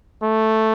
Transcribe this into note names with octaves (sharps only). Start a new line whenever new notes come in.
A3